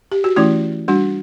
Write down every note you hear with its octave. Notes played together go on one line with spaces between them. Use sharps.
G4
F#4
E3 A3 C#4 E4
G3 D4 F#4